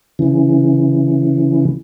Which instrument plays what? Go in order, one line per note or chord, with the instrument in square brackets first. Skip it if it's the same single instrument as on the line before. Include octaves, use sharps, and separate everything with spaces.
[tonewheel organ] C#3 E3